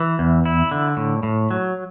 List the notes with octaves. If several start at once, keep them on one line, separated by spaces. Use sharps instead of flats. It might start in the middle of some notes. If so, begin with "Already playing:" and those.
Already playing: E3
E2
E4
D3
A2
A2
F#3